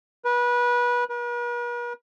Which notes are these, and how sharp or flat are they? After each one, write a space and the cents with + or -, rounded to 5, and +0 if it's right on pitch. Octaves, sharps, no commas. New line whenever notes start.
B4 -25
B4 -45